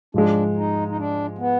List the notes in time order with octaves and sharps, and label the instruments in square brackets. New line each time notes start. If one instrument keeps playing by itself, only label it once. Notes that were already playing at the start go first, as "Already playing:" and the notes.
[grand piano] G#2 F3 G#3 [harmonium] D4
[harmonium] D#4
D#4
D4
B3